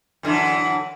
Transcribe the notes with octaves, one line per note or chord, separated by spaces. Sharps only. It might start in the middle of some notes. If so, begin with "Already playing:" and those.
F#2 D3 E3